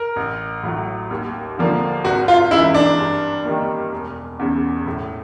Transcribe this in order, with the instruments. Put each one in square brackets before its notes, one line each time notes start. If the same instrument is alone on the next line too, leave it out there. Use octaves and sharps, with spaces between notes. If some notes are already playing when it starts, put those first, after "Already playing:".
Already playing: [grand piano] A#4
[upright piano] A1
A2 F#3
D#2
D3 F3 A#3 D4
[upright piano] G#1 [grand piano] F#4
[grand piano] F4
[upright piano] F#2 C#3 E3 G#3 [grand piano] E4
[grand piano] D4
[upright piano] G2
D#3 G3 A#3
E1
E2 C#3
A2